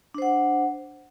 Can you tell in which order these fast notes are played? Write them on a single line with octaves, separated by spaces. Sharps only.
D4 C5 F#5